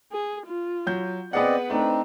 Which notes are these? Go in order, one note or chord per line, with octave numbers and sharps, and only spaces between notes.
G#4
F4
F#3 G6
B3 C4 G#4 B4 D5 D#5 F#5
A3 C4 D4 D#4